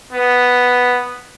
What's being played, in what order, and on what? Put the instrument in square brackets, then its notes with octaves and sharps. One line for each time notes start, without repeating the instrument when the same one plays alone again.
[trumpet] B3